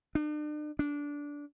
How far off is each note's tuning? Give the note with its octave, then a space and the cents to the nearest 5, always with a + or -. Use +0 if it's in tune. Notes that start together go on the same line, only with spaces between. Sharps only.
D4 +40
D4 -15